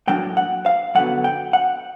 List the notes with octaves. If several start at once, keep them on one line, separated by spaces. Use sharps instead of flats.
A2 F#3 A#3 D4 G5
F#5
F5
F#2 D3 F#3 B3 F#5
G5
F#5